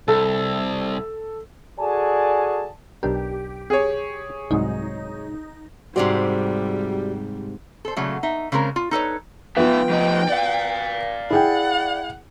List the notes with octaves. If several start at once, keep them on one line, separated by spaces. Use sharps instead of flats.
C2 A4
F#4 G#4 A4 D5 G#5 A5
B1 D4 G4 A#4
G#4 C#5
C2 G#2 F#3 D#4
G#2 C3 G3 C4 F#4 G4 D5
A4 C5
A#2 C#3 F#3 A3
D#4 E5
C#3 G#3 C4 A#4 A#5
F4
D#4 A4 B4 C#5
F3 B3 F4 E5 G5
F2 D#4
D5 F5
E4 G#4 F#5 G5